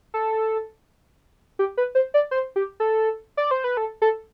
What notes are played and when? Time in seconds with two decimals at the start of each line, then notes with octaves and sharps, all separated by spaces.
0.14 A4
1.59 G4
1.77 B4
1.95 C5
2.14 D5
2.31 C5
2.56 G4
2.80 A4
3.37 D5
3.51 C5
3.64 B4
3.77 A4
4.02 A4